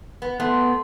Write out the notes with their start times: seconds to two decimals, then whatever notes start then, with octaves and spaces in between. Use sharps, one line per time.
0.22 B3
0.40 A3 B3 C6